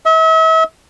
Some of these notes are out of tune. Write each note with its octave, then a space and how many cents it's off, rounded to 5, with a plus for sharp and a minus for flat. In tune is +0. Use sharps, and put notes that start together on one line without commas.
E5 -40